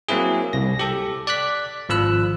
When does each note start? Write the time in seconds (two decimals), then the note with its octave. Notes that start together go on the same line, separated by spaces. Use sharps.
0.08 F#3 A#3 C4 E4 G#4
0.53 C2 A#6
0.79 G4 A4
1.27 D5 D6 F#6 B6
1.89 G#1 F3 B5 E6 F#6